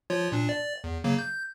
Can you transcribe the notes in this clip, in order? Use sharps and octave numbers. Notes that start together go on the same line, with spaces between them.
F3 F4 C#5
A#2 D4
D5
E2
C#3 F#3 A#3
G6